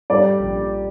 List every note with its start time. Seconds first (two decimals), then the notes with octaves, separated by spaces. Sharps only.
0.10 G3 D5
0.25 G3
0.40 A#1
0.55 G3